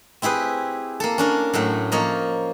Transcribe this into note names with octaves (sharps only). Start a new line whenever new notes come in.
C4 E4 G4 G#4 B4
A#3 A4
C#4 D4 A#4
A2 F#3 A3
F3 A#3 C#5 D#5